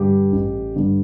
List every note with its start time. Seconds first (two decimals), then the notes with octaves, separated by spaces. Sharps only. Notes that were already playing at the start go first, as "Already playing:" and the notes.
Already playing: G2 D3 G4
0.32 A1
0.76 G2 D3